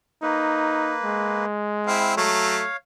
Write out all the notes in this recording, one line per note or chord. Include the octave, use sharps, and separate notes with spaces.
A#3 D#4 B4
G#3
C4 E4 F5
F#3 A3 C#5 F5